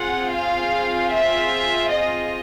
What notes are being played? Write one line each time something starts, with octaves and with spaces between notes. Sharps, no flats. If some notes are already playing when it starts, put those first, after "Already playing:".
Already playing: C4 F4 G#4 F#5
F5
E5
D#5